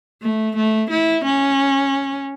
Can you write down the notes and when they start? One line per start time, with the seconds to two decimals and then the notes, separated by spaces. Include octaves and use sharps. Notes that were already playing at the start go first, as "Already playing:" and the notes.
0.22 A3
0.56 A3
0.91 E4
1.25 C#4